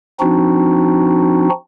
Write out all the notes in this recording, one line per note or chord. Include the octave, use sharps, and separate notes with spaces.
F3 C4 D4 D#4 F#4